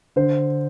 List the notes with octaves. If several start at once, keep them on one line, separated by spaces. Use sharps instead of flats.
D3 C5